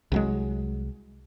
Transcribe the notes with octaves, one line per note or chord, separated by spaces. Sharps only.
C2 F#3 G#3